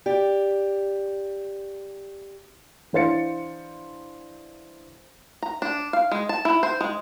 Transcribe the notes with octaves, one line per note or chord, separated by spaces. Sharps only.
G4 D5
E3 D4 C5 F5 A6 C#7
A#5
D4
F5
G#3
A5
E4
C5
G#3